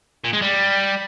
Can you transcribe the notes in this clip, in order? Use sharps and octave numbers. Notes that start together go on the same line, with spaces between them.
A#2
G#3
G3